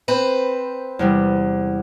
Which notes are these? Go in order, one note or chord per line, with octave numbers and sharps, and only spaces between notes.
C4 B4 C5
E2 C3 G3